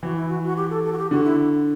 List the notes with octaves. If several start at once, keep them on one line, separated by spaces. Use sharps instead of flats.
E3 F#4
E4
F#4
F#4
G4
A4
A4
F#4
G4
D3 F#4
E4